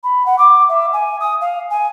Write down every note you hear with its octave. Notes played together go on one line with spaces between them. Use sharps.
B5
F#5
D6
E5
G#5
D#6
F5
G#5